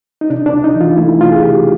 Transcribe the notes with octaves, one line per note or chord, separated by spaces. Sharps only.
D#4
C3 D4
D4
C#2
D#4
E3
F4
A3 E4
C3 F4
G#4
C#2 G4